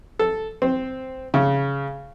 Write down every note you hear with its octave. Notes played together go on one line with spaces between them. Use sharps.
A4
C4
C#3